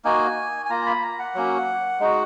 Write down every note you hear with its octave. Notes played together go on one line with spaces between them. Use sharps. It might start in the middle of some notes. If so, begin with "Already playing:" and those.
A#3 D#4 F#4 G#5
G#5
A#3 F4 A#5
B5
A#5
F#5
F#3 A#3 C#4
G#3 D#4 F#4